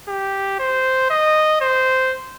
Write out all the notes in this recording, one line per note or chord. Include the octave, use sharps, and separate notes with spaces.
G4
C5
D#5
C5